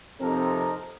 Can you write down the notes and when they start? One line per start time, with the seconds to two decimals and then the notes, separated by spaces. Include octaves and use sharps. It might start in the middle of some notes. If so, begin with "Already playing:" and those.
0.20 F2 C3 C4 D#4 A4 A#4